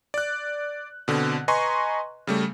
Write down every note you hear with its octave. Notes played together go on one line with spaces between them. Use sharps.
D5 F#6
B2 D3 C4
B4 D#5 G#5 A#5 C6 C#6
C#3 G3 A3